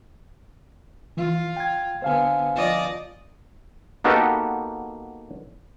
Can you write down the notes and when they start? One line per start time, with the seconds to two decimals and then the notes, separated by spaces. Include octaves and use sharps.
1.17 E3 F4
1.57 G5 G#6
2.02 D3 B3 C5 F5 G#5
2.56 F3 D5 D#5
4.04 A#3 B3 D#4 F#4 G4 A4